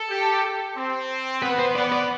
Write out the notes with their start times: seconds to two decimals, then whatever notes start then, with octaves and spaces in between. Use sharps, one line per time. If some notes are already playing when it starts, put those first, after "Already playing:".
Already playing: A4
0.09 G4
0.76 C4
1.42 B3 B4
1.59 C5
1.76 B3 D5
1.92 D5